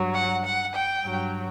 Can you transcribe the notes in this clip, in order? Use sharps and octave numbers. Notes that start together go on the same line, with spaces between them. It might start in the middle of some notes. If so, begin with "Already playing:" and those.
Already playing: G2 F#3
F#5
F#5
G5
G2 F#3